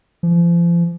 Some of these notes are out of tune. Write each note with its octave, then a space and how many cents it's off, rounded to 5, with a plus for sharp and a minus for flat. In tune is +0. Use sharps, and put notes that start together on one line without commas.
F3 -35